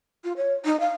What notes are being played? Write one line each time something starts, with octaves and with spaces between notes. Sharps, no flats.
F4
C#5
D#4
F5